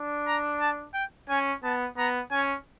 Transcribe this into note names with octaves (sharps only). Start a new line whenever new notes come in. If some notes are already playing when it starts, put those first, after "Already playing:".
Already playing: D4
A#5
A5
G5
C#4 G#5
B3 A5
B3 A#5
C#4 G#5